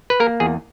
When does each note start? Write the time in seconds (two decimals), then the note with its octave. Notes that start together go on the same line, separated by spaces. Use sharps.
0.10 B4
0.20 A#3 A#4
0.40 E2 G#4